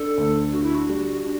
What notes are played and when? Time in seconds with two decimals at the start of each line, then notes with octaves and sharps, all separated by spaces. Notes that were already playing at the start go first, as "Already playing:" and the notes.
Already playing: D4 A4
0.17 D2
0.53 D3 F#4
0.63 E4
0.75 F#4
0.89 G3
1.24 D4